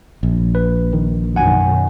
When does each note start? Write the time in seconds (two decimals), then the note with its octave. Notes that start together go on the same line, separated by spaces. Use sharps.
0.23 A#1
0.55 B4
0.93 D#3
1.36 F#2 B2 D#3 F#5 G#5